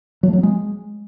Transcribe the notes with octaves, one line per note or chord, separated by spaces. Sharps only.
F#3
A3
F#3
B3
G#3